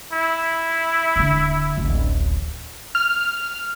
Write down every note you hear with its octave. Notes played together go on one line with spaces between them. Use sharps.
E4
D#1 D3
D1 A1
F6